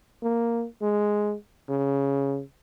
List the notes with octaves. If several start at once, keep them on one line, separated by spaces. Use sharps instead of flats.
A#3
G#3
C#3